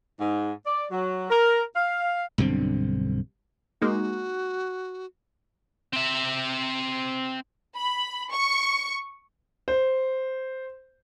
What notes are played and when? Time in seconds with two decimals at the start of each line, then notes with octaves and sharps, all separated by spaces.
0.19 G#2
0.66 D5
0.92 F#3
1.30 A#4
1.76 F5
2.38 B1 G2 D3 C4
3.82 G#3 A#3 D#4 F#4
5.93 C4 E5
7.78 B5
8.32 C#6
9.68 C5